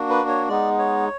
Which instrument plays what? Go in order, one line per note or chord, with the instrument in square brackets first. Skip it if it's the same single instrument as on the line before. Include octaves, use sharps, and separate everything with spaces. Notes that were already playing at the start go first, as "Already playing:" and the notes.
Already playing: [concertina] A#3 D4 F#4
B4
C#5
G#3 B3 D#4 D5
C#5